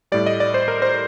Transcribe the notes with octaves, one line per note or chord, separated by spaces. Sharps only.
A2 G3 D5
D#5
D5
C5
A#4
C5